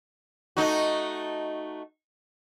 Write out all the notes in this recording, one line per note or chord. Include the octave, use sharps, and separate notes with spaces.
A3 D#4 F#4